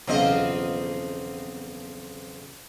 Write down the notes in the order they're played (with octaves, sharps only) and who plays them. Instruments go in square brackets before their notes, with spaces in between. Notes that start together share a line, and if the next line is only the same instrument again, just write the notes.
[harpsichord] B1 E2 C#3 [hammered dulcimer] F3 F5 [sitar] C4 D#5